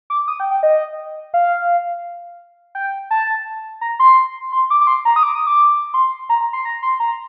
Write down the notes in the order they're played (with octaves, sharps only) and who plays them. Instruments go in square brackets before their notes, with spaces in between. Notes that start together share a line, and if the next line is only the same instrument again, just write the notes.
[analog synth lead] D6
D#6
G5
G5
D#5
F5
G5
A5
A#5
C6
C6
D6
D6
C6
A#5
D#6
D6
D#6
D6
C6
A#5
A#5
C6
A#5
C6
A#5